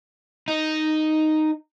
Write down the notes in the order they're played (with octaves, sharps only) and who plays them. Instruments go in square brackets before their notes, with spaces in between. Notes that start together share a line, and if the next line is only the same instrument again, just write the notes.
[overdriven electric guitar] D#4